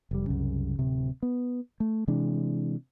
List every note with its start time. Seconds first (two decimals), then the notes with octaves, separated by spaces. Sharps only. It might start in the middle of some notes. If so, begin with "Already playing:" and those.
0.11 F1 G3
0.26 C2 F#2 C#3
0.79 D1 C3
1.23 B3
1.80 A3
2.08 C3 E3 G#3 D4